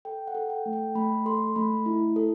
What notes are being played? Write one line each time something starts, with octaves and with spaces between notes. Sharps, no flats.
A4 G5
F#5
A4
G5
A3
G5
A3 B5
A4 C6
A3 B5
E4
A4